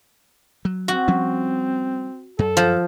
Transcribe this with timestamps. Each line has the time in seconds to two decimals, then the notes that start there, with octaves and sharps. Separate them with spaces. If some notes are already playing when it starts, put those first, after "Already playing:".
0.65 F#3
0.88 C4 F#4
1.08 F3 G3 C#4
2.39 F#2 A4
2.57 F3